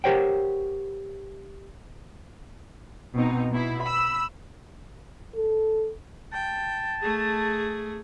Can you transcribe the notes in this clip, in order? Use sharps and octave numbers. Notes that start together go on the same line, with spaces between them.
G4 A#4 C5 C#5 F#5 G5
B2 C4 D#4
B2 E4
B5 E6
A4
G5 A5
A3 G#4